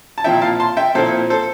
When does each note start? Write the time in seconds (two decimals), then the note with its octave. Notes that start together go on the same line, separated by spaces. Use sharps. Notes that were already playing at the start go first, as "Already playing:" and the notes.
0.18 A5
0.24 A#2 F3 C4 E4 E5 G5
0.41 F5 A5
0.60 A5 C6
0.77 E5 G5
0.95 A#2 F3 C4 E4 A4 C5
1.30 A4 C5